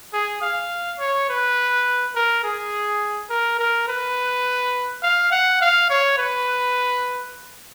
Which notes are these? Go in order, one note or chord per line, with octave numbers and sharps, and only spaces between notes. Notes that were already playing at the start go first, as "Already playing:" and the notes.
G#4
F5
C#5
B4
A#4
G#4
A#4
A#4
B4
F5
F#5
F5
C#5
B4